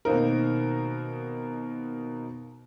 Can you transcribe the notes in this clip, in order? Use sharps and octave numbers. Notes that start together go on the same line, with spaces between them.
B2 D#3 A#3 C4 D#4 A#4